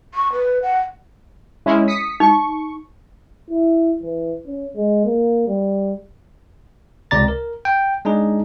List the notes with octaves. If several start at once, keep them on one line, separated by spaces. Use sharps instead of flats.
C#6
B4
F#5
G#3 C#4 E4
D#6 B6 C#7
D#4 C#6
E4
E3
C#4
G#3
A#3
G3
C#2 C3 D5 A#5 A6
A#4
G5
G#3 D4 D#4 G#4